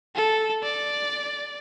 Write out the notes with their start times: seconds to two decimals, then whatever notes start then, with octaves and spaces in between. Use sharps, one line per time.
0.15 A4
0.63 D5